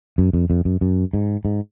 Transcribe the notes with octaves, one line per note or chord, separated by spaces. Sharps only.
F#2
F2
F2
F#2
F#2
G#2
G#2